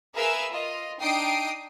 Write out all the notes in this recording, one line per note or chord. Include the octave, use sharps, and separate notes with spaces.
G#4 A#4 B4 E5 F5 E6
F4 D#5
D4 D#4 G5 D#6 C7 D7